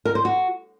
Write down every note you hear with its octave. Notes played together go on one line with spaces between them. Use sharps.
A#4
C5
F#4